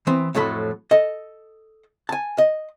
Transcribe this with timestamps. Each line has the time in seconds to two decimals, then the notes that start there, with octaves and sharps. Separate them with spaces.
0.07 E3 B3 C4
0.35 F2 A2 F#3 A4 B5
0.91 A4 D#5
2.09 G#5 A5
2.38 D#5